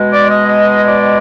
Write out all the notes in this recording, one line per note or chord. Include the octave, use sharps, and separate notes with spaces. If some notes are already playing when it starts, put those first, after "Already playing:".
Already playing: B2 G#3
D5
D#5
D#5
D5